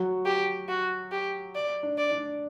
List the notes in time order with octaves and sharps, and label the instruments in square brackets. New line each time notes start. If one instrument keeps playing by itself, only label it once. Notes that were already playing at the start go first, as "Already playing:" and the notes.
Already playing: [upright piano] F#3 F#4
[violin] G4
F#4
G4
D5
[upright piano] D4
[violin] D5
[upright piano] D4